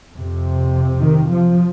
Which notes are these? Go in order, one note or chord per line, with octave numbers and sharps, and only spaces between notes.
F2 C3
D#3
F3